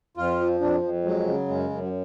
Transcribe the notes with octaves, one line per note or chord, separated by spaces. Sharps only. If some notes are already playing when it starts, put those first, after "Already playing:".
F2 F4
F3
F2 D4
F2
F#3 G#3
C#3
F#2 G#3
F#2
F#3